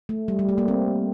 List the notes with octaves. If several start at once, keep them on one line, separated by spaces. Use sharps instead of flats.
A3
G3
G3
A3
A#3
C4